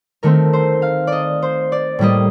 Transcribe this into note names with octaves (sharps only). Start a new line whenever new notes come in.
D#3 A3 C4 A#4
C5
F5
D5 D#5
C5
D5
A2 G3 A#3 D#5